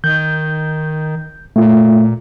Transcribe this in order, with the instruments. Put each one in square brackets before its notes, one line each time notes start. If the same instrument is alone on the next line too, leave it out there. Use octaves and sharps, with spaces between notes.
[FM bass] D#3 [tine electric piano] G6
[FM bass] A#2 [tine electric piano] A3 F4